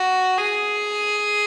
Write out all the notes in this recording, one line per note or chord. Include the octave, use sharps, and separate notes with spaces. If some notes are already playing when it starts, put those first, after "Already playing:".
Already playing: F#4
G#4